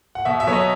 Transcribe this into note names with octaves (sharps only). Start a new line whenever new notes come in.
F#5
B2 E5
E5
F#3 B3 C#5
D#5